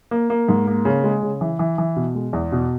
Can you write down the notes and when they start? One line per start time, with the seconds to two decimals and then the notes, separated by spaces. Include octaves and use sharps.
0.11 A#3
0.30 A#3
0.49 G#2
0.67 A#3
0.85 C#3
1.04 G#3
1.22 C#3
1.41 E3
1.59 E3
1.78 E3
1.96 B2
2.15 G#3
2.33 E2
2.52 B2